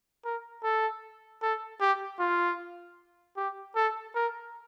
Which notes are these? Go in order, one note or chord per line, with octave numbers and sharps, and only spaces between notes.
A#4
A4
A4
G4
F4
G4
A4
A#4